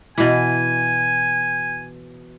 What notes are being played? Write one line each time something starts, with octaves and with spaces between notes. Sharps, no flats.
B2 E3 G#5